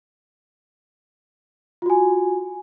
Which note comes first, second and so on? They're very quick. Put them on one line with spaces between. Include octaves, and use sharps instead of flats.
F4 F#4 G#5